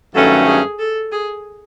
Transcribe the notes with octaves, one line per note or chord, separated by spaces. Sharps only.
G2 D#3 F#3 A3 C#4 A4
G#4
A4
G#4